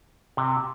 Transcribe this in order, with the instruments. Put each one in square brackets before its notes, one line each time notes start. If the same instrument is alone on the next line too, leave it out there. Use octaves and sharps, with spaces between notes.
[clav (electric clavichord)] C3